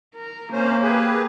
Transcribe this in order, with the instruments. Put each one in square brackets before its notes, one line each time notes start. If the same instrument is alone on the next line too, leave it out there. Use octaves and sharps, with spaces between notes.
[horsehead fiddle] A#4
[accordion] C3 C#4 C5 [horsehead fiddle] A#3
[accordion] G4 G#4 B4